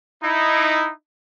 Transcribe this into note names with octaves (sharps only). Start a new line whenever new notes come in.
D#4 E4